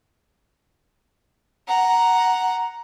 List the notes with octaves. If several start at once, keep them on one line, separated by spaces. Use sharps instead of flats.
F#5 A#5